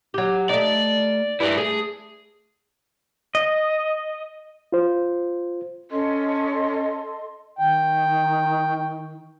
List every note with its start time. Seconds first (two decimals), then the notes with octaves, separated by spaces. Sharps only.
0.14 F#3 G4
0.49 A3 D#4 D5
1.40 G2 E4 D5 E5
1.57 A3 G#4
3.35 D#5
4.72 F4 C5
5.91 C#4 A4 D#5 C6
7.59 D#3 G5